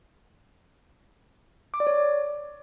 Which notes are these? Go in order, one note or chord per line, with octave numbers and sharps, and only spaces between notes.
D6
D5
C#5